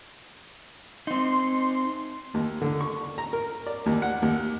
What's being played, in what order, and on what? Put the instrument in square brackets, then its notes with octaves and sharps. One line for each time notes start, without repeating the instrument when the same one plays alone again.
[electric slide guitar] C4 D#4 [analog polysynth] C6
[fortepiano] D#2
D3
C#6
A#5
A#4
D5
D#2
F#5
D#2